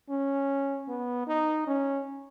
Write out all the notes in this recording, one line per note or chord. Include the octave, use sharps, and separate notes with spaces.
C#4
B3
D#4
C#4